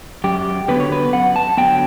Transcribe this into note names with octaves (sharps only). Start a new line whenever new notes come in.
F#2 G4
D3 F#3 B3 B4
C#5
B4
F#2 F#5
A5
D3 F#3 B3 G5